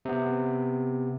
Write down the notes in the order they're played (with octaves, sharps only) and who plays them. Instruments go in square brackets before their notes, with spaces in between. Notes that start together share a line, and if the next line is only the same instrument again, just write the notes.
[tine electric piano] C3 B3